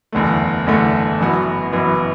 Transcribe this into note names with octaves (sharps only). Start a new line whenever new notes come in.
F#1 E2 D3 A3
F#1 E2 D3 A3
F#1 F#2 E3 B3 F#4
F#1 F#2 E3 B3 F#4